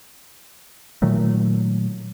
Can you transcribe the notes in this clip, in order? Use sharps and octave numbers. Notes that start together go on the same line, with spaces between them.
A#2 D#3 F#3 A3